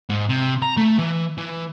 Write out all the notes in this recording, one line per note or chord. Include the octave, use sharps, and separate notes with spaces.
G#2
C3
A#5
A3
E3
E3